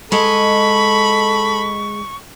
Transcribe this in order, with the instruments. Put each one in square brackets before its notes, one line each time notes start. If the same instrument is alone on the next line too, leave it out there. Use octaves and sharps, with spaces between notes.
[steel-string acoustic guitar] G#3 D#5 [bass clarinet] A4 [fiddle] B5 [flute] C#6